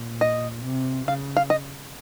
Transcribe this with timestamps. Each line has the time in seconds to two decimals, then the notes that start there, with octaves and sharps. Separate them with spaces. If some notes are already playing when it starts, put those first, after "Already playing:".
Already playing: A#2
0.21 D#5
0.64 C3
1.07 C#3 F5
1.37 F5
1.50 D#5